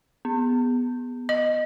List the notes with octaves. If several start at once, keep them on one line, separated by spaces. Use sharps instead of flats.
B3
D#5 F#7